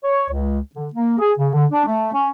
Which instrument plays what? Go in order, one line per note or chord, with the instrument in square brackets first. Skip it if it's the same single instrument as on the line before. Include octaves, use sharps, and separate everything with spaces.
[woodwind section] C#5
C#2
D3
A#3
G#4
C#3
D3
D4
A3
C#4